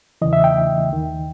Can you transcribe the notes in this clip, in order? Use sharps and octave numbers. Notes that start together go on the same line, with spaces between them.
E2 C#3 E3 D#5
E5
G5
D#2 D#3